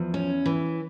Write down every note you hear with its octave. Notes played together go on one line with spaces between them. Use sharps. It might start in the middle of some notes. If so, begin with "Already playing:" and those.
Already playing: E2 F3
C#4
E3